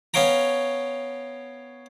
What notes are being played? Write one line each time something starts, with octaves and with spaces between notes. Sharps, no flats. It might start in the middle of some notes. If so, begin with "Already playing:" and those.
B3 C#4 C#5 F5 G5 A#5